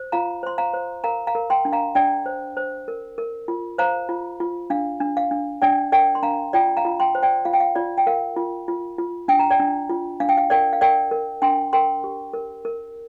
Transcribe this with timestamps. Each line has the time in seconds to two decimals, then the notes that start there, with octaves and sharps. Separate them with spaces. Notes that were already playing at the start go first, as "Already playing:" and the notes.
Already playing: C5
0.12 F4 F5 A#5
0.43 C5 C6
0.58 F5 A#5
0.74 C5
1.04 A#4 F5 A#5
1.27 F5 A#5
1.35 A#4
1.50 G5 C6
1.65 D4
1.73 F5 A#5
1.95 D4 D5 G5
2.26 C5
2.57 C5
2.88 A#4
3.18 A#4
3.48 F4
3.78 C5 F5 A#5
4.09 F4
4.40 F4
4.70 D4 F5
5.01 D4
5.17 F5
5.31 D4
5.62 D4 D5 G5
5.92 A#4 D5 G5
6.15 C6
6.23 D4 F5 A#5
6.53 F4 D5 G5
6.77 F5 A#5
6.85 F4
7.00 G5 C6
7.15 C5
7.23 D5 G5
7.45 F4 F5
7.53 G5
7.60 F5
7.76 F4 D5
7.98 G5
8.07 A#4 F5
8.37 F4
8.68 F4
8.98 F4
9.28 D4 G5
9.39 A#5
9.50 D5 G5
9.59 D4
9.89 F4
10.20 D4 F5
10.29 G5
10.37 F5
10.50 A#4 D5 G5
10.73 F5
10.81 A#4 D5 G5
11.11 A#4
11.42 D4 G5 C6
11.73 A#4 G5 C6
12.04 G4
12.33 A#4
12.65 A#4